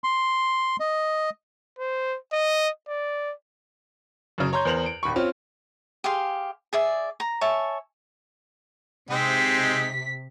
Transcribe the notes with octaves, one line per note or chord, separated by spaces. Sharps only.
C6
D#5
C5
D#5
D5
F#2 C#3
C#5 A#5 C6 G6
E2 A#4 C5 F7 F#7
D7
D#1 D#2 B5 C#6
C4 C#4 F4
G4 G#4 F5 C6
G#4 D5 E5
A#5
C#5 E5 G#5 A5
C3 G#3 C4 D#4 B6